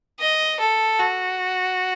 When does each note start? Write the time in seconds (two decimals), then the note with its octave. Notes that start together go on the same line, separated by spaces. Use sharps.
0.20 D#5
0.60 A4
0.99 F#4